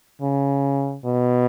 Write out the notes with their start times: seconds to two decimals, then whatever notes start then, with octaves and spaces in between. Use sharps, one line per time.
0.22 C#3
1.05 B2